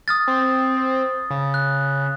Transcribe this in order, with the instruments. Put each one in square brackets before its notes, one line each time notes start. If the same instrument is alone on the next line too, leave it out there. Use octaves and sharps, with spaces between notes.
[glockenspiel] D#6 F6 A6
[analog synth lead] C4
C#3
[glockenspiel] F#6